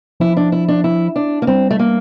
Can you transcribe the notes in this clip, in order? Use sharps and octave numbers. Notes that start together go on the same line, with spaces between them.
F3 E4
D4
E4
D4
E4
D4
A#3
G3 C4
A3
A#3